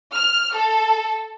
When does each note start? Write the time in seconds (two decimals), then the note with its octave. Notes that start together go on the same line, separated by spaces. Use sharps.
0.13 F6
0.55 A4